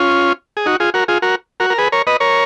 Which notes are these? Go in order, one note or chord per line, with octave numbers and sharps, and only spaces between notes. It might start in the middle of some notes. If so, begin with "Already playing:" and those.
Already playing: C#4 F4
G#4
D#4 F#4
F4 G#4
F#4 A#4
F4 G#4
F#4 A#4
F#4 A#4
A#4
G#4 B4
A#4 C#5
B4 D#5
A#4 C#5